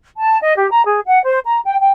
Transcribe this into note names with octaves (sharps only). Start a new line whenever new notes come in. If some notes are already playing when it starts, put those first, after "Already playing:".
A5
D#5
G4
A#5
G#4
F#5
C5
A#5
G5
G5